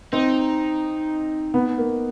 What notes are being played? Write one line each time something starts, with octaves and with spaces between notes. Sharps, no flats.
C4 D#4
B3
A#3